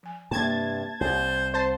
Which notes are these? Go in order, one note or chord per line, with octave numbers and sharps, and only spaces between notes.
F3 G#5
G2 C3 A#3 A5 G#6 A6
C2 C5 C#5
C4 C5 A5